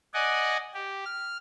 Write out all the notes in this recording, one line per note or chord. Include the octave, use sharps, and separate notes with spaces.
D5 D#5 F#5 G#5
G4
F6